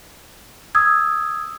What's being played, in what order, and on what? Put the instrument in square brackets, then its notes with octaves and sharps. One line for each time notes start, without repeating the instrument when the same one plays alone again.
[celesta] D#6 E6 G#6